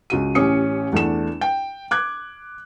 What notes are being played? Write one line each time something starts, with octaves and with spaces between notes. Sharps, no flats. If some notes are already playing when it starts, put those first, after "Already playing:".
C#2 F#4 D#7
A1 C#4 G4 D#6 C#7
E2 A3 D4 E7
G5
D6 F#6 G#6